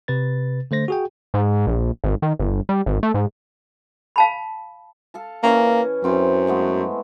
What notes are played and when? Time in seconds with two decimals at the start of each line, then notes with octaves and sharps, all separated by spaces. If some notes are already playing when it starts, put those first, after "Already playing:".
0.08 C3 B4 A6
0.71 D3 A3 C5 A#6
0.88 F#4 G#4 G5
1.34 G#2
1.67 A#1
2.04 G#1
2.22 D#3
2.39 G1
2.69 G3
2.86 G#1
3.03 A3
3.14 G#2
4.16 F5 A5 B5
5.14 A4 F5 A5
5.43 E3 A#3 C#4 G#4
6.04 F#2 C4 E4
6.47 G#3 A3 B3